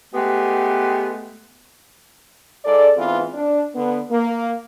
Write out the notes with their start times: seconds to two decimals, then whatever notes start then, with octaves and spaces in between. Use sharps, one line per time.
0.14 G#3 A3 B3 G4
2.65 G#2 A4 D5
2.97 G#2 E3 B3 C4 F4
3.34 D4
3.75 D3 B3
4.11 A#3